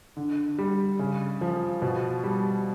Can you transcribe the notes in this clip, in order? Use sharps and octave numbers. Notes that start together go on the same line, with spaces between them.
D3
G3
C#3
F3
B2
G3